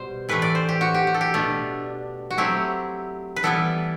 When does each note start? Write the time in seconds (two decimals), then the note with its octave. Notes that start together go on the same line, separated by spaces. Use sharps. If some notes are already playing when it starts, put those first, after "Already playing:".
Already playing: B2 G3 C5
0.29 A2 E3 A3 B4
0.42 D5
0.55 C5
0.69 G4
0.81 F#4
0.94 G4
1.07 F#4
1.14 A4
1.21 G4
1.34 B2 A3 D4
2.31 F#4
2.38 F#3 A3 C4 E4 G4
3.36 B4
3.43 E3 G3 B3 E4 A4